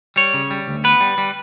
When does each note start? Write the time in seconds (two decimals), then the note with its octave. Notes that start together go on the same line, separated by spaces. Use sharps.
0.16 G3 C#5
0.34 C#3
0.51 G3
0.68 D2
0.84 B3 B4
1.01 G3
1.18 G3